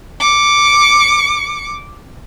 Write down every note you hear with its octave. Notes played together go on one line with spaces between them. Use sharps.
D6 C#7